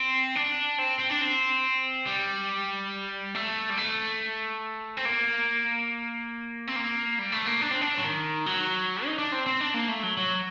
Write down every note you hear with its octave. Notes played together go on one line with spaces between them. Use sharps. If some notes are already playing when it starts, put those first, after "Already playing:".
Already playing: C4
D4
C4
C4
D4
C4
G3
A3
G3
A3
C4
A#3
C4
A#3
G3
A3
A#3
D4
C4
D4
F#3
D#3
F#3
D#4
D4
C4
C4
D4
A#3
A3
F#3
F#3